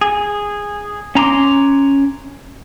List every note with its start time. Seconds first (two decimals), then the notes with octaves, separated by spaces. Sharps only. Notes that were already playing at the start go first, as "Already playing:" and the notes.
0.01 G#4
1.15 C#4 A#5 C6 D6